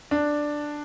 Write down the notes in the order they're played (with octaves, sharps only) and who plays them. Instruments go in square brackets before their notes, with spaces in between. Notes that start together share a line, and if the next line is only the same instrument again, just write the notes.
[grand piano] D4